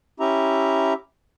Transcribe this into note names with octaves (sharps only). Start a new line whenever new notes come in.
C#4 E4 G4 E5 A#5